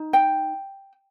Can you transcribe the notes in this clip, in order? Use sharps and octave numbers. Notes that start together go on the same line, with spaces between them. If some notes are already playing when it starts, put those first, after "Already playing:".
Already playing: D#4
G5